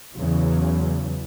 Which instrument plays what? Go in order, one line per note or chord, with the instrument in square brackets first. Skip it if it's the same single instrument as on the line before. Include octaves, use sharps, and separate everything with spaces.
[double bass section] E2 C#3 E3 F#3